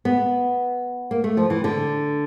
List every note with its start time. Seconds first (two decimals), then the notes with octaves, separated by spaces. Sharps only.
0.05 B3
1.11 A#3
1.24 A3
1.37 F3
1.50 E3
1.64 D3